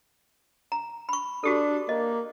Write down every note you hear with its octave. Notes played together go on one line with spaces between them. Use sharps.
A#5
B5 C#6
D4 F#4 G4 A4
A#3 D#5